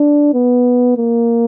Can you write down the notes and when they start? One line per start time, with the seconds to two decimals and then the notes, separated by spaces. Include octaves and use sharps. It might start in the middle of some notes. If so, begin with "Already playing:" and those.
Already playing: D4
0.34 B3
0.97 A#3